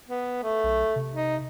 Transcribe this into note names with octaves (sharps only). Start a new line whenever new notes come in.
B3
A3
B1
C3
D#4